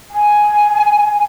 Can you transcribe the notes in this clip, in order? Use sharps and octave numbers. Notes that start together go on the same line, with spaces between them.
G#5